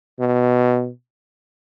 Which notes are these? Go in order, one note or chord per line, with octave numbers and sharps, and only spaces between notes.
B2